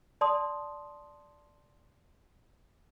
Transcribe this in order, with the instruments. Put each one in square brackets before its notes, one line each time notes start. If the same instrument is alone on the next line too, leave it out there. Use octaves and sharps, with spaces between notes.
[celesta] D5 A5 C6 D#6